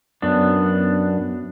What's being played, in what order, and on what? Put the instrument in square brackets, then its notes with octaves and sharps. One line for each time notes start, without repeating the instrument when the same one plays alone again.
[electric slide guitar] F#2 B3 D4